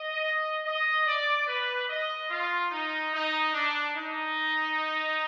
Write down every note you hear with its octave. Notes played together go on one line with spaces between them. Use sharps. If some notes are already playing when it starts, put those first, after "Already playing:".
Already playing: D#5
D#5
D5
B4
D#5
F4
D#4
D#4
D4
D#4